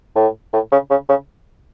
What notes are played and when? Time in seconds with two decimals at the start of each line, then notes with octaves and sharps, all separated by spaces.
0.16 A2
0.53 A2
0.72 C#3
0.90 C#3
1.09 C#3